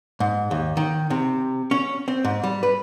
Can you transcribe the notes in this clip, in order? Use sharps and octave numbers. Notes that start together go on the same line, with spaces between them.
G#2
D#2
D#3
C3
C#4
C4
G#2
G3
B4